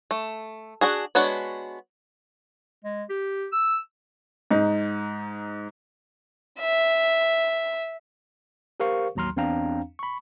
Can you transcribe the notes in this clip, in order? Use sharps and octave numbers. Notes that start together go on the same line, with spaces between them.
A3
D4 F#4 G#4
G#3 B3 D4 F#4 C#5
G#3
G4
E6
G#2 D#4
E5
G4 A#4 C5 F5 C#6
A1 D#2 F#3 A#5 C6 F6
E2 C4 D4 F5 G5 A#5
B5 C#6